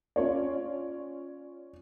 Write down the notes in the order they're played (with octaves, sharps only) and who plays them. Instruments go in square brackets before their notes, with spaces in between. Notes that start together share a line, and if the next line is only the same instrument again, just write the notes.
[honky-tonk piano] C#4 F4 C#5 D5